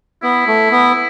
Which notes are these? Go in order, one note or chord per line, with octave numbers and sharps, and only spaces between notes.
B3 E4
A3
B3